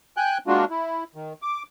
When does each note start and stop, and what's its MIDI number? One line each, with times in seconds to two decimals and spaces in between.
0.17 0.38 79
0.17 0.38 80
0.17 0.38 90
0.17 0.38 91
0.47 0.65 56
0.47 0.65 58
0.47 0.65 62
0.47 0.65 65
0.47 0.65 66
0.70 1.04 64
1.15 1.33 51
1.42 1.63 86